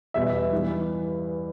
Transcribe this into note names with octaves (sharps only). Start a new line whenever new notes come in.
E2 B2 G3 E5
G2 E3 G3